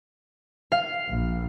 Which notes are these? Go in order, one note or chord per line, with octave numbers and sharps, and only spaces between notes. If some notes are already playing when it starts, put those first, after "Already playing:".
F5
A#1